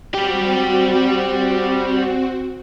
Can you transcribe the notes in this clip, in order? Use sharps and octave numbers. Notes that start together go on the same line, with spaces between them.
G3 C4 F#4 G4